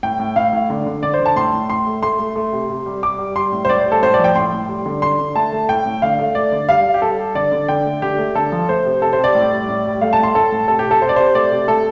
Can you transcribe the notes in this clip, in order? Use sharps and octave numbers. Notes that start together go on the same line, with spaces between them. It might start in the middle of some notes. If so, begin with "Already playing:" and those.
A2 G5
A2
A2 F5
A2
D3
D3
D3 D5
C5
D3
A5
A2 C6
A2
A2 C6
A3
A3 C6
A3
A3
C3
C3
G3
G3 D6
G3
G3 C6
A2
C5
A2 D5
C5
G3
A4
A2 C5
D5
F3
G5
A2 C6
A2
G3
D3
D3 C6
D3
A3 A5
A3
A2 G5
A2
D3 F5
A3
A3 D5
D3
G3 F5
G3
G4
G3 A4
G3
D3 D5
D3
D3 G5
A3
D3 G4
A3
D3 A4
F3
A3 C5
C3
C3 A4
C5
C3 D5
A2
G3
A2
G3
A3 F5
A5
A2 C6
A2 A4
A2
C3 A4
G4
C3
A4
C3 C5
D5
C3 C5
A3 D5
C3
A3 A4